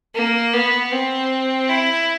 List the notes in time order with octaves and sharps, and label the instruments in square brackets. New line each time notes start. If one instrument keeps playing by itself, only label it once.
[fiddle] A#3
B3
C4
E4